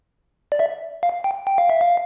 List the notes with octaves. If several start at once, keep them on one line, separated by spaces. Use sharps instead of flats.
D5
E5
F5
G5
G5
F5
E5
F5